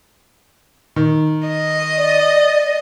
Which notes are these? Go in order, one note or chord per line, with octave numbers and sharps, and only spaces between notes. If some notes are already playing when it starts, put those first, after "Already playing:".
D#3
D#5
D5